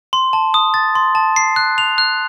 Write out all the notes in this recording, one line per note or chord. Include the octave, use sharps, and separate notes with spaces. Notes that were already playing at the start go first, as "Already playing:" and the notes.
C6
A5
D#6
A6
C6
A5
C7
F#6
F7
F#6